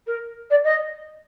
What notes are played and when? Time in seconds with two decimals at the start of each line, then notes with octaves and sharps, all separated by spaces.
0.07 A#4
0.50 D5
0.64 D#5